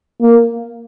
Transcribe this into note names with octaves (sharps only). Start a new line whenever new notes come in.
A#3